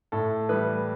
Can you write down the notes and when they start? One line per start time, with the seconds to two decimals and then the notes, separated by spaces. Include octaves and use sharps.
0.12 A2 A4
0.49 E3 G3 B4